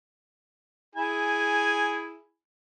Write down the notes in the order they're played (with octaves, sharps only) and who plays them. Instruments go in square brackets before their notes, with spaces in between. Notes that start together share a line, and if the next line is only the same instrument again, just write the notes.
[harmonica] E4 G#4 G#5